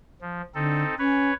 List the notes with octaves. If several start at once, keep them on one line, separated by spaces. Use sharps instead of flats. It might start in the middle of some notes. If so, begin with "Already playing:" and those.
F3
D3 C4 D#4 A4
C#4 B4 C#5